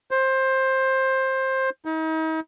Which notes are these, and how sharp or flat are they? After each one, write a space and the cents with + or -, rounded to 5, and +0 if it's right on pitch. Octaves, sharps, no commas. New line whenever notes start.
C5 +15
D#4 +40